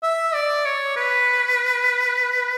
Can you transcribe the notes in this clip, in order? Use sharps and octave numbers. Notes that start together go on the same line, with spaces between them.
E5
D5
C#5
B4